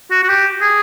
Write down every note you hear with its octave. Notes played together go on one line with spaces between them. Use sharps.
F#4
F#4
G4
G#4